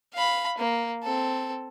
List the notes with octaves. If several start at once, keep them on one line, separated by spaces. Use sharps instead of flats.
F5 B5
A#3
C4 A4